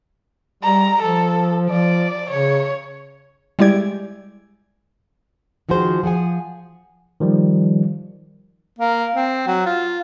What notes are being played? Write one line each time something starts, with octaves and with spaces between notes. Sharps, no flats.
G3 A#5
F3 A4
F3 D5
C#3 C#5
G3 G#3 E4 G4 D5 G#6
D#3 F3 F#4 G#4 C5
F3 G#4 F#5 G#5
D#3 F3 G3
A#3
C4
F#3
F4